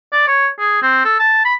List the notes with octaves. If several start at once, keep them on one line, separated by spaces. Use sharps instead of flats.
D5
C#5
G#4
C4
A4
A5
B5